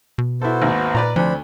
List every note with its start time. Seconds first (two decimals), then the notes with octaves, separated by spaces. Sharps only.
0.18 B2
0.42 B3 E4 F#4 A4 C5
0.62 G#1 D#2
0.95 A#2 B4 D5 A#5
1.16 D2 F3 C4 D4 B5